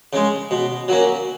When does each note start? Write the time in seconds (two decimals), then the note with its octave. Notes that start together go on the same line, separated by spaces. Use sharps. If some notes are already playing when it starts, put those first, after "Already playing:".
0.13 C#3 G#3
0.51 B2
0.88 F#3 A#3 C#4